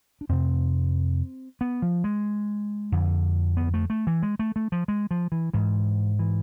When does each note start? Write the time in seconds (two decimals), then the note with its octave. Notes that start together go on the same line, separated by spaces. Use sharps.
0.21 D4
0.29 F2 C3 C4
1.61 B3
1.82 F3
2.04 G#3
2.92 F2 D3
3.57 B3
3.74 A3
3.90 A3
4.07 E3
4.23 G#3
4.39 A3
4.56 A3
4.72 F3
4.88 G#3
5.11 F3
5.32 E3
5.53 G#2 E3
6.19 E3